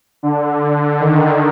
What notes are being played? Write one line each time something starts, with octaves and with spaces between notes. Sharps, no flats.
D3
D#3